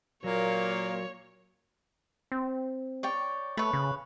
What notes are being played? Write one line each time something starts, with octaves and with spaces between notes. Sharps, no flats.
A#2 F#3 A#3 C#5
C4
C#5 D5 G5
A3 B4 C#5
C#3